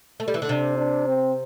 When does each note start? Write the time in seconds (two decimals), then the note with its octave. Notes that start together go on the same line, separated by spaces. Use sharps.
0.20 A3
0.28 G3
0.34 E3
0.42 D3
0.49 C3 D4
0.78 D4
1.07 C4